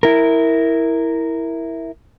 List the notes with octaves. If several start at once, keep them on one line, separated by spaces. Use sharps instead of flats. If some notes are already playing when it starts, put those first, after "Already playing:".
E4 A#4